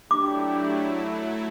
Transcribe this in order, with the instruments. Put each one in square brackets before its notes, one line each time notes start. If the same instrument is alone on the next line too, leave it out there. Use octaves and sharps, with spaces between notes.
[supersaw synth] F#3 A3 E4 [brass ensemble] D4 G4 [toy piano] D6